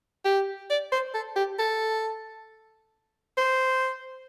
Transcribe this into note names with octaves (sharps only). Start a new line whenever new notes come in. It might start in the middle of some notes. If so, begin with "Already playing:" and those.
G4
D5
C5
A4
G4
A4
C5